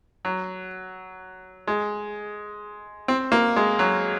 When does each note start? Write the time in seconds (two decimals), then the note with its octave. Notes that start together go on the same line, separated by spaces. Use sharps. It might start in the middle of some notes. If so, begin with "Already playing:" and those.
0.25 F#3
1.67 G#3
3.08 C4
3.32 A#3
3.56 G#3
3.79 F#3